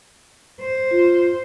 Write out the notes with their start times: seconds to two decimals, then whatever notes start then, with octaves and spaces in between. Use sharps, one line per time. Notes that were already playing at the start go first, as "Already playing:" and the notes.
0.61 C5
0.91 F4